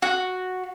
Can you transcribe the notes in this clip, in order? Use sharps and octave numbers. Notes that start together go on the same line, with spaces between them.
F#4